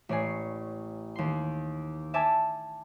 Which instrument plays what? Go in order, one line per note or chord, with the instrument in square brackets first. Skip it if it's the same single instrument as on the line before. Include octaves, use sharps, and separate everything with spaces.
[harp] A1 C#5 D5 G#5 C7
D#2 C6
E5 G#5 A5 D6 E6